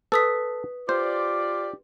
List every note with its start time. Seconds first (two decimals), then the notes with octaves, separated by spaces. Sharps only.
0.12 A4 B4 D#6 B6
0.89 F4 G4 C5 D5